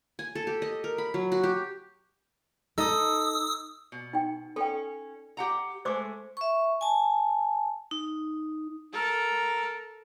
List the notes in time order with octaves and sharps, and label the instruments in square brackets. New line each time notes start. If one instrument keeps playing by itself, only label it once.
[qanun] G#5
A4
G4
D#5
A#4
B5
F#3
F#4
G4
[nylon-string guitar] D#4 A4 [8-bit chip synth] D#6 E6
[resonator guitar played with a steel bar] B2
[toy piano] D#4 G5
[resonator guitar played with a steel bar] C#4 [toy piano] A4 G5
[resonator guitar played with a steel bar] G4 F#5 A#5
[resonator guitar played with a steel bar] G#3 A3 [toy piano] C5 D6
[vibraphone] E5 C#6
G#5 A5
D#4
[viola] A4 A#4